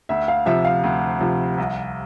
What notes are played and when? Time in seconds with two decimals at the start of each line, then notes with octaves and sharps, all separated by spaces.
0.09 D2 E5
0.28 F5
0.46 C3 F3 E5
0.65 F5
0.84 D2
1.21 C3 F3
1.58 C2